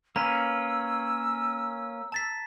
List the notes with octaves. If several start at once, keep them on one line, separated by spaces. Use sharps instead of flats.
A#3 C#4 B4 A#5 E6
A5 A6 B6